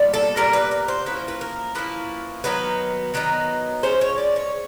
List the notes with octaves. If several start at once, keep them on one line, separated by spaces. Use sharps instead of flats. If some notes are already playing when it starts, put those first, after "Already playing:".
Already playing: A#2 G3 B3
A4
A#2 G3 B3 A#4
B4
A#4
C5
F3 A#3 C#4 E4 B4
C5
B4
A#4
F3 A#3 C#4 E4 B4
D#3 F#3 B3 D#4 B4
D#3 F#3 B3 D#4
F3 G#3 C#4 C5
C#5
D5
C#5